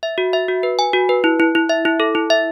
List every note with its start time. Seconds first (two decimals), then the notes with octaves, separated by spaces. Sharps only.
0.03 E5
0.18 F#4
0.33 E5
0.48 F#4
0.63 B4
0.79 G#5
0.93 F#4
1.09 B4
1.24 E4
1.40 E4
1.55 E4
1.69 E5
1.85 E4
2.00 A4
2.15 E4
2.30 E5